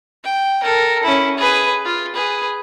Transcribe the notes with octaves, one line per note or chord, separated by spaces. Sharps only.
G5
A4 A#4
C#4 E4
G#4 B4
F4
G#4 B4